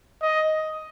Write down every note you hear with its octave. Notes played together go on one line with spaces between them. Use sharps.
D#5